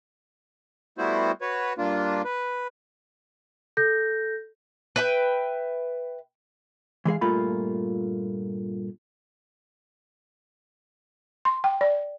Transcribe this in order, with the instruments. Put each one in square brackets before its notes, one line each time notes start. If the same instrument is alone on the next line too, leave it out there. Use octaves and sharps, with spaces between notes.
[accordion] G3 A3 B3 E4 F#4 C5
F#4 B4 C#5
G2 A#3 D4 F4
B4
[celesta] A4 G6 A#6
[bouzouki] B4 E5 G5
[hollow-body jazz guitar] E3 G#3 G#4 F5
G2 A#2 A3 A#3 F4 B5
[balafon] C6
G5
D5